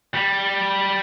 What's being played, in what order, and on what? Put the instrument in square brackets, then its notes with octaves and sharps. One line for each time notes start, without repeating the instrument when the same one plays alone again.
[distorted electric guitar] G3